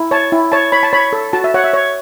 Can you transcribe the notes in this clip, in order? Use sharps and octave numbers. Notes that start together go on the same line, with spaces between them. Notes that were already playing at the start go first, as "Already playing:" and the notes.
Already playing: E4
C#5 A5
E4
C#5 A5
C#5 B5
A5
C#5 B5
A4
F#4 A5
E5
C#5 F#5
E5
C#5